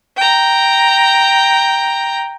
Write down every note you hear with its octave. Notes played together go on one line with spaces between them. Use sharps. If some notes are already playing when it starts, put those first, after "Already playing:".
G5 A#5